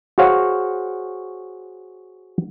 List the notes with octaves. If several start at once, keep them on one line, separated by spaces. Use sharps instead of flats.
F#4 G#4 C5 C#5 F5 F#5